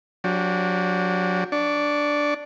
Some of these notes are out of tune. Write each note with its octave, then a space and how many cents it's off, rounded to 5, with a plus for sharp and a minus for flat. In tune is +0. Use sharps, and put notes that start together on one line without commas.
F#3 -25 D4 -20 G4 +0
D4 +0 C#6 +25